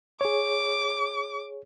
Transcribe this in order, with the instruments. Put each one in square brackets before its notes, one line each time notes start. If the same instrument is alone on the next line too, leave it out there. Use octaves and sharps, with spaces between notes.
[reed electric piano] G#4 C#5 [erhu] D6